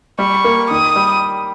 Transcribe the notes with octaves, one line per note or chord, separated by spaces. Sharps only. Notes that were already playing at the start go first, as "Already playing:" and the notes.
G3 C#6
A#3
D#3 D#6
G3